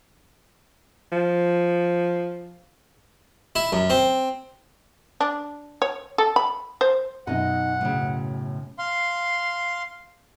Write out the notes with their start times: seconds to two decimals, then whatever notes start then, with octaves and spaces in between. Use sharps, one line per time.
1.12 F3
3.56 E4
3.72 F#2
3.90 C4
5.21 D4
5.82 C#5
6.18 A4
6.36 B5
6.81 C5
7.27 F#2 B2 D#4 D#5 F#5
7.81 A2 C#3
8.79 F5 C6